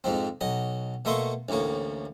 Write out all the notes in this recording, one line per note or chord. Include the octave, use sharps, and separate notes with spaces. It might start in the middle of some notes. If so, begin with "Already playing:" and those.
F2 G#2 F3 C4
B1 F#3 D#5
B2 A3 A#3 E5 C6 C#6
A1 D2 A2 A#3 C#5